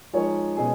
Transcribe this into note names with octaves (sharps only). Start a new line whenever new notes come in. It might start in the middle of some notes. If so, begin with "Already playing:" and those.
F3 G#3 D#4 A#4 C#5
B2 G#3 C#4 G#4